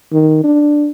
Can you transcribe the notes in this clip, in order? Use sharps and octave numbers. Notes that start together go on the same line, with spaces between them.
D#3
D4